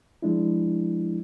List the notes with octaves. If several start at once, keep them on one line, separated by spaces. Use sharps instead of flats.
F3 G#3 D4 E4